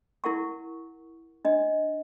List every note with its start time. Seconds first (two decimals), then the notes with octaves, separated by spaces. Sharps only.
0.24 E4 A#4 F#5 C#6
1.45 D4 D#5